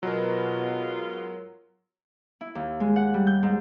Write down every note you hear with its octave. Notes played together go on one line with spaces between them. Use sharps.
G#2 B2 F#3 B3 F4 A#4
E4
D#2
G#3
F#5
G3
G6
G#2